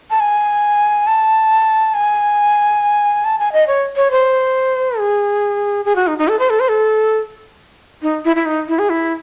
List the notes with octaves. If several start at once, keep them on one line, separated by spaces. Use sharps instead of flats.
A5
G#5
A5
G#5
A5
G#5
D#5
C#5
C#5
C5
G#4
G#4
F#4
D#4
D#4
A4
C5
A4
C5
A4
D#4
E4
E4
D#4
E4
G#4
E4